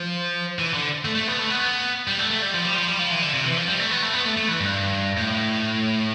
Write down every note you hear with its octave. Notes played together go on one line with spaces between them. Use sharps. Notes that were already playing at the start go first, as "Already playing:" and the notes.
Already playing: F3
E3
D3
A3
A3
B3
A3
B3
G3
A3
A3
G3
F3
G3
F3
G3
F3
E3
D3
C3
E3
F3
G3
A3
B3
A3
B3
A3
A3
E3
G2
A2